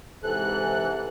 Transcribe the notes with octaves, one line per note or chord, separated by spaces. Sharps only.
G#2 C3 E3 A4 F#6